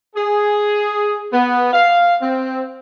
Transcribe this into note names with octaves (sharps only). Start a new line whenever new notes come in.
G#4
B3
F5
C4